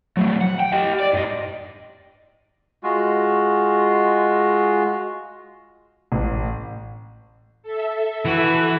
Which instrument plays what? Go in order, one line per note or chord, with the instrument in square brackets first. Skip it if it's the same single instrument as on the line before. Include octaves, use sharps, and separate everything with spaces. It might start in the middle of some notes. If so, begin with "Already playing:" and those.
[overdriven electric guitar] F#3 A3
F#5
G5
G4 D#5
D5
G2 D#5
[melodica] G#3 F4 F#4
[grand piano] A1
[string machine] A4 E5
[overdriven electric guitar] E3 [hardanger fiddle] F#4 B4